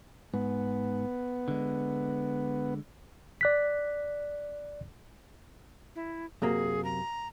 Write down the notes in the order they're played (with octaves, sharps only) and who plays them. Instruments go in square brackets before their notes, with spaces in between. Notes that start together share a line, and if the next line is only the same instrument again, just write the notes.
[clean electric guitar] G#2 [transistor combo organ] B3
[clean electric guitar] D3 G#3
[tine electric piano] D5 F#6 B6
[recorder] E4
[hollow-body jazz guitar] F#2 C3 A#3 [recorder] G#4
[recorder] A#5